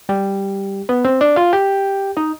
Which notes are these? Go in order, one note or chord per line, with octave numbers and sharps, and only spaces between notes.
G3 G4
B3 B4
C4 C5
D4 D5
F4 F5
G4 G5
D#4 D#5